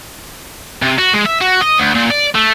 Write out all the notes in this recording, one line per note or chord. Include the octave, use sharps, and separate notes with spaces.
C3
F#4
G#3
E5
F#4
D#5
D2
A#2
D5
A3